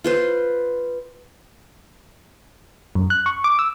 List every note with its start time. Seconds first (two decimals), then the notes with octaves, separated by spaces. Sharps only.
0.04 F4 B4 C5
2.95 F#2
3.10 F#6
3.26 C#6
3.44 D6
3.59 E6